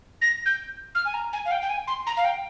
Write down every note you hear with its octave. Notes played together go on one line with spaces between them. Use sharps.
A#6
G6
F6
G#5
A#5
G#5
F5
G5
G5
G#5
C6
A#5
F5
G5